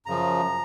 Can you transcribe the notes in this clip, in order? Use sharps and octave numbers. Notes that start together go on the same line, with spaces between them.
F#2 C#3 F3 A#5